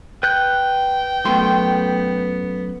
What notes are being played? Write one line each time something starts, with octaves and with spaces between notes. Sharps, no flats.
B4 G5 F#6 G6
F#2 A3 B3 C6